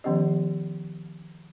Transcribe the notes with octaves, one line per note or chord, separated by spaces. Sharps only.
D#3 F3 B3 C#4 G4 D#5